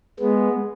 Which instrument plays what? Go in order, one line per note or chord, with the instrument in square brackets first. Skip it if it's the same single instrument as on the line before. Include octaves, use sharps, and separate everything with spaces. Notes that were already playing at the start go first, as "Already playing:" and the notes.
[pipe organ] G#3 B3